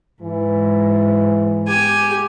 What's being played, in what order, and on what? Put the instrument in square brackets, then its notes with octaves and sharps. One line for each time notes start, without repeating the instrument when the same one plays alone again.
[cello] G#2 [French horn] E3
[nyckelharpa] G4 G#5